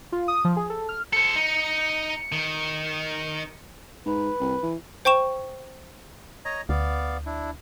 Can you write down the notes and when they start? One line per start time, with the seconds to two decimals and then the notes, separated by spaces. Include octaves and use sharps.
0.12 F4
0.28 D#6
0.45 F3
0.56 G#4
0.70 A4
0.89 F6
1.13 A4 C5 C#7
1.36 D#4
2.32 D#3
4.06 G#2 B4
4.40 C2
4.63 E3
5.05 C5 G5 C#6 E7
6.45 C#5 D#5 A#5
6.69 D2 B3 D5 F5
7.26 D4 E4